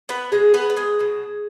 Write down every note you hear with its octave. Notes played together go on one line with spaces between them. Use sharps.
B3 B4
B2 F#3 G#3 G#4
B3 B4
B4
G#3 G#4
B2 F#3